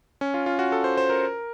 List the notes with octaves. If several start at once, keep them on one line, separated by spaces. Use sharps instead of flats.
C#4
F4
F4
F#4
A4
C5
C5
A#4